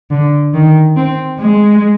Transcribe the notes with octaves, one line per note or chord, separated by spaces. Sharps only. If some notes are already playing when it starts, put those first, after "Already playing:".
D3
D#3
C4
G#3